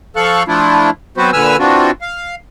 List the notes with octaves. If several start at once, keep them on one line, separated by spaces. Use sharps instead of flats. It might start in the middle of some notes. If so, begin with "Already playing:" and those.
F3 A4 F5 C#6 F#6
F3 A3 D4 E4 F4
F#3 B3 C4 F#4 B4 C5
A#2 D3 B4 G#5 E6 F6
E3 C4 D4 F4 F#4
F5